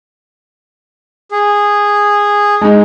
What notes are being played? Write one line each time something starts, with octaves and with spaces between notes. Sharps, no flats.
G#4
G#3 D#4